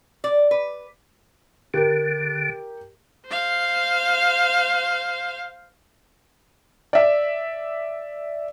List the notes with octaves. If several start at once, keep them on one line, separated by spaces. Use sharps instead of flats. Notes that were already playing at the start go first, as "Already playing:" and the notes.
D5
B4
D3 G4 A#4
C5 F5
D5 E5